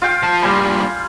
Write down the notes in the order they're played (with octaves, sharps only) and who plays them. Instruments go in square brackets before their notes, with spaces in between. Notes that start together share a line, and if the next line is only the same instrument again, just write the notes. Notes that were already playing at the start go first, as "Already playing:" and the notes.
[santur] F4 F5 G5
[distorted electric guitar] F3 A5
[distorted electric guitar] G2 A#2 [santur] G3 G#5 B5